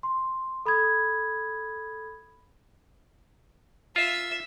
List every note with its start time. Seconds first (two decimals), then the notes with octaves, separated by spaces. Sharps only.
0.03 C6
0.66 A4 B5 D#6 G#6
3.96 F4 E5